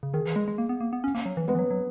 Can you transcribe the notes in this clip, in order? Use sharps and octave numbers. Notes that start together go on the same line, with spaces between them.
C#3
D#3 G#4
E3
G#3
G#3
A#3
B3
A#3
B3
C#4
A#3
F#3
E3
G#3 B3 B4
E3
F#3
F#3